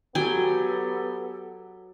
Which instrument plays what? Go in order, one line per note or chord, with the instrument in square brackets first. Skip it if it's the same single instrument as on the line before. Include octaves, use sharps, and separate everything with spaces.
[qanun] F#3 G5 G#5 [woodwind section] B3 G4 A4